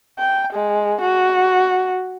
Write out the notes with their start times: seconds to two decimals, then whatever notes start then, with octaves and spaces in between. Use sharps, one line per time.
0.19 G5
0.53 G#3
1.01 F#4